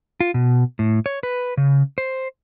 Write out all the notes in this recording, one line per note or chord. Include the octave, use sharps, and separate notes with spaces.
F4
B2
A2
C#5
B4
C#3
C5